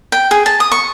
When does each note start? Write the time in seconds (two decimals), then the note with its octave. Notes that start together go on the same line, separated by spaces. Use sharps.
0.12 G5
0.31 G#4
0.46 A5
0.60 D#6
0.72 C#6